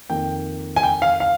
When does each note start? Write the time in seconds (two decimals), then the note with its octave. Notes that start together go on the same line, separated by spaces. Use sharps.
0.09 F2 D#3 A#3 G5
0.76 G#5
0.83 G5
1.02 F5
1.20 F5